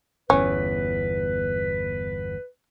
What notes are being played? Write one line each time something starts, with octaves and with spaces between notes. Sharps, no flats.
G1 E2 C#4 B4